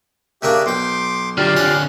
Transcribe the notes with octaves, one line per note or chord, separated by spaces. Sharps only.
C#3 A#3 D4 G4 E5
B1 G5 C6 D6
D3 F#3 F4 G4 D5
D3 C#4 F#5